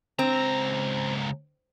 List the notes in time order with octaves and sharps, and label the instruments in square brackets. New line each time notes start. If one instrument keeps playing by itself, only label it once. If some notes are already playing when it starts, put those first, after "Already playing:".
[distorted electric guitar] C#2 A#5 [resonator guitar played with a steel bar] C4